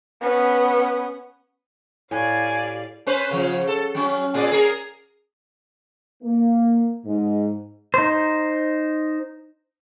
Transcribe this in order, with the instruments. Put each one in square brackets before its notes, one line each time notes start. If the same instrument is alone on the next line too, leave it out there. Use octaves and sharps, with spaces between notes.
[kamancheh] B3 C#4
[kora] A2 [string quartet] G4 D5 F5 [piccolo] G#5
[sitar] C#4 B4 C5
C#3 F3
A4
F#3 C#4
A#2 G#4 D5
G#4 A#4
[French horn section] A#3
G#2
[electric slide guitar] D#4 C5